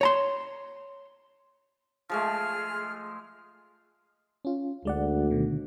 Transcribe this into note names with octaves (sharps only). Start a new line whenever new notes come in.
C#5 A#5 C6
F3 G#3 A3 G#4 F6
C#4 F4
D2 G#3 D5 F#5
B2 D3 D#3